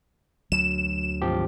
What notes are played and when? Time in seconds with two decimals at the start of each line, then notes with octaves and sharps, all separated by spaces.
0.52 D2 F#3 E7
1.22 G#1 F3 G4